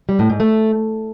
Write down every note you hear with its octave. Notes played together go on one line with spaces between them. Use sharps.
G3
A2
G#2
A3